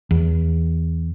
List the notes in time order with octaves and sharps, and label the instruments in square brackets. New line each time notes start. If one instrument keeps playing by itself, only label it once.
[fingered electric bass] E2